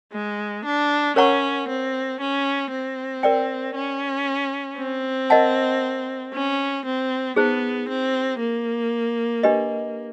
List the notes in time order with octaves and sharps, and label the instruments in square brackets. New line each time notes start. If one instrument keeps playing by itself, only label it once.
[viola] G#3
D4
[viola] C#4 [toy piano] A#4 C#5 F#5 A#5 C#6
[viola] C4
C#4
C4
[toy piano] A#4 D5 G5
[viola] C#4
C4
[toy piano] A#4 D#5 F#5 A5
[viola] C#4
C4
[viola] B3 [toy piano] D#4 G#4 C5
[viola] C4
A#3
[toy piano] D4 G4 B4 D#5